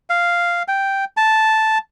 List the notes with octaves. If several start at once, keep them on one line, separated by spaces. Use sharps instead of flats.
F5
G5
A5